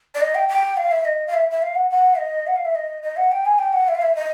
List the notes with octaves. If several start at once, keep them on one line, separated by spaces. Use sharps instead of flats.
D5
D#5
G5
G5
F5
E5
D#5
F5
E5
E5
F5
F#5
F#5
D#5
F#5
F5
E5
D#5
D#5
F#5
G5
G#5
G5
F#5
E5
F5
E5
D#5